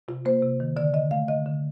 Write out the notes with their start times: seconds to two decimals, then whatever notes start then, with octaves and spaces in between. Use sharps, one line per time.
0.08 C3 F4
0.25 A#3 C5
0.42 C3
0.60 D#3
0.76 D3 D5
0.93 D3 D#5
1.11 A3 F5
1.28 D3 D#5
1.46 D3